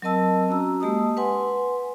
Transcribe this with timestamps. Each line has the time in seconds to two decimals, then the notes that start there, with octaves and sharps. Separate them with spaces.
0.02 F#3 C4 A#4 D#5 A5 E6
0.49 C#4 F#4 A#5 E6
0.80 G#3 A#3 G4 D#5 A5 D#6
1.17 B4 F#5 G#5 C6